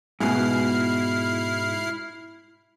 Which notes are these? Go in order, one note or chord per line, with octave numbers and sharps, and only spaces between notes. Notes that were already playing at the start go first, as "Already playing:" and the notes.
G#2 B2 E4 F6 C7